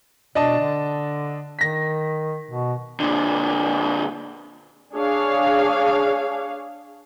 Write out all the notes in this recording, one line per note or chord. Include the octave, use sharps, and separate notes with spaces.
B2 D4 D#5 A5
D3
D#3 A#6 B6
B2
A#2 D3
D4 G#4 C#5 F5